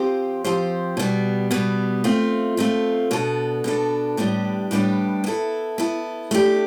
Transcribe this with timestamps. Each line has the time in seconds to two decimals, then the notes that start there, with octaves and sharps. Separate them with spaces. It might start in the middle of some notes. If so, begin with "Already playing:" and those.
Already playing: F3 C4 G4 C5
0.44 F3 C4 G4 C5
0.97 B2 G3 B3
1.51 B2 G3 B3
2.04 A3 C4 F4
2.57 A3 C4 F4
3.11 B2 B3 D4 A4
3.64 B2 B3 D4 A4
4.17 A2 G3 B3 D4 G4
4.71 A2 G3 B3 D4 G4
5.24 B3 E4 A4
5.78 B3 E4 A4
6.31 A3 D4 G4